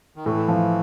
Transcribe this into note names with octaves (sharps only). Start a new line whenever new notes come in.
D#3
A2 E3
F3